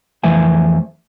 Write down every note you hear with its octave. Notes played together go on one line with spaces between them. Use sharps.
F2 E3 A3 C5 E5 G#5